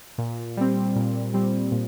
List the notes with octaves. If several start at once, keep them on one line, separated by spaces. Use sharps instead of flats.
A#2
G3 C4
A#2
G3 C4
A#2